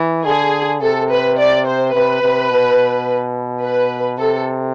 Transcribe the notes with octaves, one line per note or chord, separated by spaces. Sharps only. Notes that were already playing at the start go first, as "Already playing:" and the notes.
Already playing: E3
D3 G#4
C3 A4
B4
D5
C5
C3 B4
C3
B2
B4
C3 A4